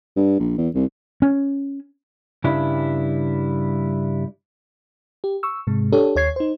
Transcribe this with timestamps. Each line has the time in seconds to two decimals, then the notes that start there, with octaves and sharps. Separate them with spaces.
0.17 G2
0.39 A#1
0.58 E2
0.75 C2
1.22 C#4
2.44 G2 C#3 G3 D4 E4
5.24 G4
5.43 C#6 E6
5.67 G#2 C3 G#3
5.92 D4 G4 A4 C#5
6.16 D#2 C#5 G#6 C7
6.36 D#4 C5